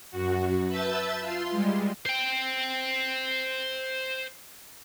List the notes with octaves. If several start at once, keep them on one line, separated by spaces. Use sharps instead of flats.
F#2 F#4
B4 E5 A5 E6 G6 A6
F4 C6
G3 G#3
C5 G5